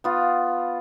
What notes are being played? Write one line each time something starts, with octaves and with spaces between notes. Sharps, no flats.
B3 F4